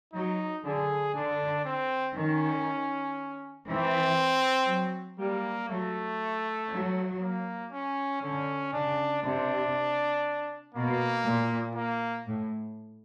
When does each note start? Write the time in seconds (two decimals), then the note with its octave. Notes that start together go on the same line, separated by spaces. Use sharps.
0.13 F#3 D#4
0.64 D3 G#4
1.15 D3 D4
1.65 C4
2.16 D#3 C#4
3.67 E3 C4
4.69 F#3
5.19 G3 A#3
5.69 F#3 A3
6.71 F#3
7.21 A#3
7.72 C#4
8.22 D3 C#4
8.73 C#3 D4
9.23 C3 D4
10.75 B2 A#3
11.25 A#2
11.76 A#3
12.27 A2